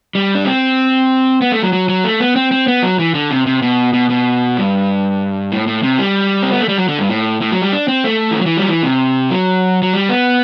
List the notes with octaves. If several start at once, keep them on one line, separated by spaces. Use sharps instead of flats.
G3
D4
C4
B3
A3
F#3
F#3
F#3
A3
B3
C4
C4
B3
F#3
E3
D3
C3
C3
B2
B2
B2
G2
A2
A2
C3
G3
C4
B3
A3
G3
F#3
D3
G2
A2
A2
F#3
G3
D4
C4
A3
E3
D3
F#3
E3
F#3 G3
E3
C3
F#3
F#3
G3
B3